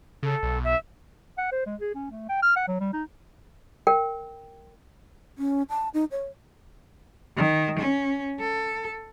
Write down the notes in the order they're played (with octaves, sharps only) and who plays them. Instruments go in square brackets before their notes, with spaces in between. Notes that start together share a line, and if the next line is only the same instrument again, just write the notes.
[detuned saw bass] C#3 [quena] A4
[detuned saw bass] B1
[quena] E5
[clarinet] F#5
C5
G#3
G#4
C#4
A3
G5
F6
F#5
F#3
G3
D#4
[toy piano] A#4 G5
[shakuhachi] C#4
A5
D#4
C#5
[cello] D#3
C#4
A4